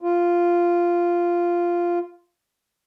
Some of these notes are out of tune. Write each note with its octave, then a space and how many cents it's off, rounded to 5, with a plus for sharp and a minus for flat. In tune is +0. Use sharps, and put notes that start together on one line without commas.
F4 -5